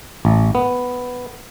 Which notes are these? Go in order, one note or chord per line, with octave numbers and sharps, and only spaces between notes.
A1
B3